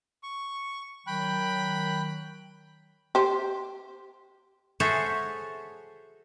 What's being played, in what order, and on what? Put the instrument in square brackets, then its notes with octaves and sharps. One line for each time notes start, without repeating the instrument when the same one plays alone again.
[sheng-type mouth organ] C#6
[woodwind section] D#3 F#3 [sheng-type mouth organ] G5 B5 F#6
[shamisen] G4 C5
[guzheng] F#4 G#4 A4 C5 C#5 E5